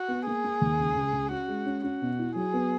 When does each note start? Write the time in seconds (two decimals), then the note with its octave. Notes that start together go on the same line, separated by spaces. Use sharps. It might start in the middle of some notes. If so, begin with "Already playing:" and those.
Already playing: F#4
0.08 B3
0.26 A#3 G#4
0.44 A#3
0.61 D#2
0.79 C#2
0.96 C#2
1.13 C#2
1.31 C#4 F#4
1.48 G#3
1.66 C#4
1.84 C#4 F#4
2.02 B2
2.19 E4
2.35 F#3 G#4
2.54 B3